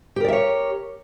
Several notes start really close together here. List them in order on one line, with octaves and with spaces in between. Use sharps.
G4 A#4 D5 E5 C#5